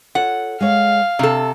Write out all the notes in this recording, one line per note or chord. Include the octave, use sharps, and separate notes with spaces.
F4 A4 C#5 F#5
G#3 C#5 F5
C3 D4 A4